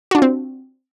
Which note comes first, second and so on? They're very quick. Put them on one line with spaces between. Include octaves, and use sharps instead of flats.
F#4 D4 F4 C4